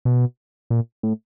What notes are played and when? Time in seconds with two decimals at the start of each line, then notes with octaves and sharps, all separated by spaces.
0.05 B2
0.70 A#2
1.03 A2